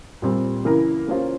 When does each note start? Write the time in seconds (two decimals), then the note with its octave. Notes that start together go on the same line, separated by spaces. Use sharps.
0.22 A#2 G3 C4
0.65 C#3 E3 A#3 E4 A#4
1.08 A#3 C#4 F4 C5